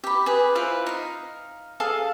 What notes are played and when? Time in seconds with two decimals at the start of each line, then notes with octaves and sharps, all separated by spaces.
0.04 G4 B5
0.26 G#4 B4
0.55 E4 F4 B4 C5
0.86 D#4 F5
1.80 G#4 A4 F5